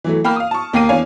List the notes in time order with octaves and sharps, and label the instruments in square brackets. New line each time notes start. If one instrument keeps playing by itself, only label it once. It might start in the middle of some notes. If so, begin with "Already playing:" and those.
[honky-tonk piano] E3 F#3 A3
A#3 G5 B5 F6
F5 D#6
A5 C#6
D#2 A#3 G5 C7 D#7
E2 D4 C#5 F5 G#5